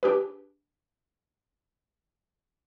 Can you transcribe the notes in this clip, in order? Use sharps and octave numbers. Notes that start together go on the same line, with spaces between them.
D4 G4 G#4 B4